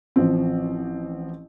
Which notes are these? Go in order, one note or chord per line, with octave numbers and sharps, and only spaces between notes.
A1 F3 C4